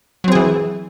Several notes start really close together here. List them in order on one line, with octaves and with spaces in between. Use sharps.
F#3 C4 G#4 E3